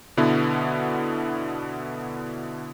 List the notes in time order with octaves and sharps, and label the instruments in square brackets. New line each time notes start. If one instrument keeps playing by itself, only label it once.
[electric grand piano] B2 D3 B3 E4